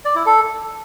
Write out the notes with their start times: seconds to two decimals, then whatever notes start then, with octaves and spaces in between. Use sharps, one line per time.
0.05 D5
0.15 E4
0.26 A4